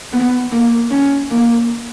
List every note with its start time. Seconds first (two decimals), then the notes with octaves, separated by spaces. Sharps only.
0.13 B3
0.52 A#3
0.91 C#4
1.30 A#3